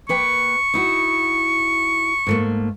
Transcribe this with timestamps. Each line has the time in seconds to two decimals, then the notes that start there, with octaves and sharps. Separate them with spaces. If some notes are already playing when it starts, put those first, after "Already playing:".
0.09 A#3 B4 G5 C#6
0.74 D#4 E4 F#4
2.27 G#2 A3 A#3